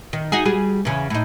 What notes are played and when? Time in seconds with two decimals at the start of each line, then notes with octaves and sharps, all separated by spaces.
0.13 D#3
0.32 D#4 F#4 G#4
0.45 G3 F#4 G#4
0.85 E2 C#3
1.10 A2 D#4